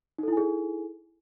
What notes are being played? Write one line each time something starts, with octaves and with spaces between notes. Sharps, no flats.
D#4 E4 G#4 A4 G#5